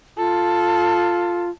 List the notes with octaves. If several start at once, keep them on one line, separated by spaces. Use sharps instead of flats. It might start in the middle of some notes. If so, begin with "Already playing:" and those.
F4 A4